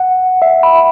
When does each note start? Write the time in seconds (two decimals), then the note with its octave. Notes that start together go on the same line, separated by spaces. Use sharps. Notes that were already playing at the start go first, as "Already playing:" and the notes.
Already playing: F#5
0.42 E5
0.63 B5